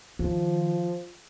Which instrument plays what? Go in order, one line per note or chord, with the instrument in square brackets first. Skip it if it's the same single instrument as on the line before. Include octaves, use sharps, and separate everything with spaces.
[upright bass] D#3 [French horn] F3